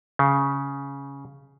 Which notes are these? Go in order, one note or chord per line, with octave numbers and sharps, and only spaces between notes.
C#3